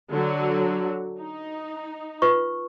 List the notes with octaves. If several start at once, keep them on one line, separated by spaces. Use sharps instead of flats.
D3 F#3 F#4
D#4
F4 B4 C#6